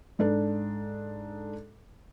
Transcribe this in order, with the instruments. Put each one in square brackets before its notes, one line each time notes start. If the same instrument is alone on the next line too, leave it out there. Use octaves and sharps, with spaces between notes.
[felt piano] G#2 D4 A4